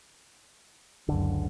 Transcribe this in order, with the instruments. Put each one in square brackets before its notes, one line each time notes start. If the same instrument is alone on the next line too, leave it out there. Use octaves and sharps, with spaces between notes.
[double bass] F#1 [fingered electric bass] C#2 D3